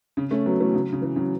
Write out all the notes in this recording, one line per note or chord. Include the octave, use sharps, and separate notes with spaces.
C#3
A3 C#4
F#3 B3
E3 A3
C#3 F#3
C#3
E3
C#3 F#3